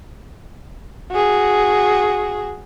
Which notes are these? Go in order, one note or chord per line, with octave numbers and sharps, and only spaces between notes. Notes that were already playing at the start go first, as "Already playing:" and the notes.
F#4 G#4